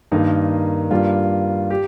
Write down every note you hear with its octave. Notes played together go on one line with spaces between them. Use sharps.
G2 D#3 A#3 D#4
G2 G3 A#3 F4
G4